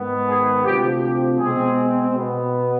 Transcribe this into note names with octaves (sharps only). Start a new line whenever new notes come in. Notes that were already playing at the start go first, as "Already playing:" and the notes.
Already playing: G#2 D#3 B3
G#4
D2 C3 F3 C4 G4
G4
B2 G#3 C4 G#4
B2 B3